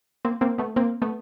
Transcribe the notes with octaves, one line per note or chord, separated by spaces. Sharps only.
A#3 C4
A#3 C4
A3 B3
A#3 C4
A3 B3